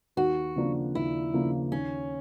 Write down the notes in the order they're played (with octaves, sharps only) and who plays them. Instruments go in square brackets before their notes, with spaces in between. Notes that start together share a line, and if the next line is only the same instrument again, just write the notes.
[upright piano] D#2 [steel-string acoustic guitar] F#4
[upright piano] C#3 F3 A#3 D4
[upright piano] D#2 [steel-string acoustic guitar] E4
[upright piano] C#3 F3 A#3 D4
[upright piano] D#2 [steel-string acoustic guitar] C#4